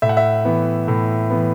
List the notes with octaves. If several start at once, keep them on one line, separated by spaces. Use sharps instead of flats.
A2 E5
F#5
E5
E3 B3
A2
E3 B3